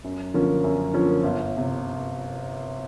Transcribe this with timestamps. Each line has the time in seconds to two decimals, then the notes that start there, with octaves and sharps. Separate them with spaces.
0.04 F#2
0.34 D3 F3 A#3 C#4
0.64 F#2
0.94 D3 F3 A#3 C#4
1.23 G1
1.57 C3